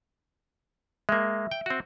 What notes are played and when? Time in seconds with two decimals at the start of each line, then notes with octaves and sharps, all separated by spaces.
1.09 G#3 A#3 E5
1.51 G5
1.66 C4 F#4